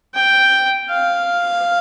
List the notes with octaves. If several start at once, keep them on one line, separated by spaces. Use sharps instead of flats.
G5
F5